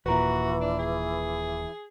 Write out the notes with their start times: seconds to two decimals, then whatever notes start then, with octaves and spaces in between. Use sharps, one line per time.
0.06 D#1 A#2 E3 F#4 B4 A#5
0.61 D4
0.79 G#4